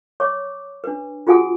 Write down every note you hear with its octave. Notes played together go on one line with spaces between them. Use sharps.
C#5 C#6 D6
D4 B4
F4 F#4 G#4 F#5 G#5 D#6